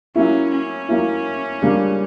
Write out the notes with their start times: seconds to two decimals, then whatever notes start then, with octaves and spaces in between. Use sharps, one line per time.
0.15 F#3 A#3 C#4 E4
0.52 C#4
0.89 F#3 A#3 E4
1.62 C#2 C#3 G3 A#3 D4